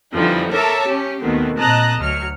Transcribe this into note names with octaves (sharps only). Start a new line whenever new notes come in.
F2 D3 E3 F3 G3 D#4
A4 A#4 C#5 E5 A5 D6
C#4 G4
D#2 B2 D#3 A3 B3 C4
A#2 C4 D#5 A5 A#5 F#6
D2 F#3 F6 C#7